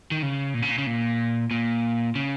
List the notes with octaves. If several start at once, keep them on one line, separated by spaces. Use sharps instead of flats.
D#3
C#3
A#2
C#3
A#2
C#3
A#2
A#2
C#3